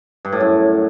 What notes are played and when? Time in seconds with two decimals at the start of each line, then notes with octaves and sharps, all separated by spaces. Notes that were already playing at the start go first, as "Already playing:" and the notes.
0.25 G2
0.32 A2
0.40 F#2